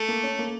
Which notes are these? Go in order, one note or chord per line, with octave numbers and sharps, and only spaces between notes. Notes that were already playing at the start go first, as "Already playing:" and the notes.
Already playing: A3
A#3
C#4
A#3